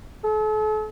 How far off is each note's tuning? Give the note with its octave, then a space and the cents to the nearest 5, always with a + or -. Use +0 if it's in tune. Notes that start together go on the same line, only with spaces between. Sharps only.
A4 -40